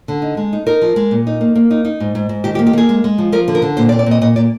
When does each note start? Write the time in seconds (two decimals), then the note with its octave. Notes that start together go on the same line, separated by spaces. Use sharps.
0.08 D3
0.22 D#4
0.37 G#3
0.53 D#4
0.66 D#4 A#4
0.82 F3
0.96 G#3
1.11 A#2
1.27 D#4
1.41 A#3
1.55 A#3
1.71 D#4
1.85 D#4
2.00 G#2
2.15 G#2
2.29 G#2
2.44 D#3 G4
2.55 G4
2.59 A#3
2.67 G4
2.73 A#3 G#4
2.89 G#3
3.04 G#3
3.18 F3
3.32 F3 A#4
3.48 D3
3.55 A#4
3.62 D3
3.77 A#2 C5
3.89 D5
3.92 C4
3.99 D5
4.06 A#2 D#5
4.21 A#2 D#5
4.36 A#2 D5